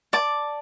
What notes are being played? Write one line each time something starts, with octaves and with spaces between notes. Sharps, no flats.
D5 A5 D6